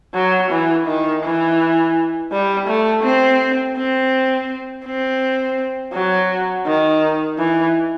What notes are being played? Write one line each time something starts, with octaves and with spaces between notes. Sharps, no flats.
F#3
E3
D#3
E3
G3
A3
C4
C4
C4
F#3
D#3
E3